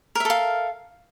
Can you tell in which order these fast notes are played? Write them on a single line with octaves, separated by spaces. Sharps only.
A#4 E5 A4 F5